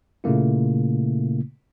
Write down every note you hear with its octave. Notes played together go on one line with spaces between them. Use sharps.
A#2 C#3 A3 A#3 E4